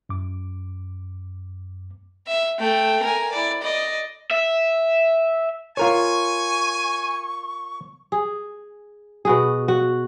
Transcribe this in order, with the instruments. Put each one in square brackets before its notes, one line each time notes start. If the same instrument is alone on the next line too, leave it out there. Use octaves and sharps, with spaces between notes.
[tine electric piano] F#2 D6
[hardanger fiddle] E5
A3 G5
A#4 G#5
E4 D5
D5 D#5
[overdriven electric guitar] E5
[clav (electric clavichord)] F4 A#4 C#5 [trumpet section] G#5 [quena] C#6
[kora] G#4
B2 F#4 G#4
F#4